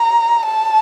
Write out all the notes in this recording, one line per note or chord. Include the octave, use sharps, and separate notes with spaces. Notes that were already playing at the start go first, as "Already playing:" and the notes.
Already playing: A#5
A5